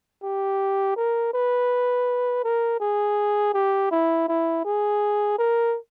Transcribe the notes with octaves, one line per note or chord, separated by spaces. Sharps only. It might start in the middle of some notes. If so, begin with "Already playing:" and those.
G4
A#4
B4
A#4
G#4
G4
E4
E4
G#4
A#4